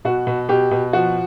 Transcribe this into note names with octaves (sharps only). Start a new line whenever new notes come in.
B2 F#4
B2
B2 G4
B2
F3 F#4